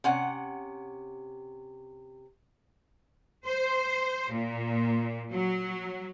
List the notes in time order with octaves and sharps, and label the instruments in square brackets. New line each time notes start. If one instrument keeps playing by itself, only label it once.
[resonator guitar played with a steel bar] C3 C#4 F#5
[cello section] C5
A#2
F#3